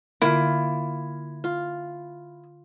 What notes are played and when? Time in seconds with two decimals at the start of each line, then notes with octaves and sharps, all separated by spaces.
0.22 D3 A#3 E4 F4
1.44 F4